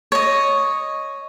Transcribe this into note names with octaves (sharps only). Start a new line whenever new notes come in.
C#5 D#5